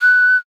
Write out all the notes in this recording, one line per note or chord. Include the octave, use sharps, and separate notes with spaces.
F#6